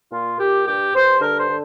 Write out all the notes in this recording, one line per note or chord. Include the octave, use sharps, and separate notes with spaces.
A#2 F4
A#2 G4
G2 G4
G2 C5
D3 A#4
C5
D3